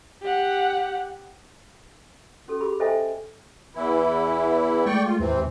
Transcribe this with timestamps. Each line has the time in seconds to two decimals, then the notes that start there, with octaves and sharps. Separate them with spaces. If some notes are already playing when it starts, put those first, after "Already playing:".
0.22 G4 F#5
2.48 C#4 F#4 A4
2.61 G4 G#4 B5
2.80 A4 C5 D#5 E5 G5 G#5
3.75 E2 E3 E4
4.86 G#3 A3 D5 G5 C#6
5.05 F4
5.19 D#2 G#2 C3 E3 C4